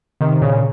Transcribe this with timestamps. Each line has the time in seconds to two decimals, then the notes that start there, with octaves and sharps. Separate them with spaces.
0.21 C3 D#3
0.41 A#2 C#3